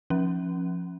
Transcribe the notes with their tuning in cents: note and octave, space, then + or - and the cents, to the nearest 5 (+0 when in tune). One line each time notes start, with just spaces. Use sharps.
F3 +0 C#4 -25